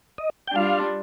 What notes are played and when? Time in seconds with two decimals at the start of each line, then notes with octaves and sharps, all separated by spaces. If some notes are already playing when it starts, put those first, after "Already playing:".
0.18 D#5
0.48 G5
0.55 G3 D4 F4 F5